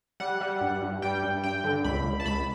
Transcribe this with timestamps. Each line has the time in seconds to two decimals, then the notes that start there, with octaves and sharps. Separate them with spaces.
0.20 G3 F#5
0.41 G3
0.61 G2
0.82 G2
1.02 G3 G5
1.22 G2
1.43 G2 G5
1.64 D3
1.84 C#2 B5
2.04 C#2
2.20 A5
2.25 C#2 B5